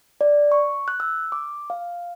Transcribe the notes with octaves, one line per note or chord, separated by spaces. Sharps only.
D5
C#6
F#6
E6
D6
F5